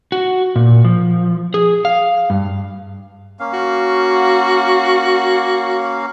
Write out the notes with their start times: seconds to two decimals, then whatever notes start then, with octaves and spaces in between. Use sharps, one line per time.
0.12 F#4
0.56 A#2
0.85 F3
1.54 G#4
1.85 F5
2.30 G2
3.40 A#3 C#4 F5
3.54 F#4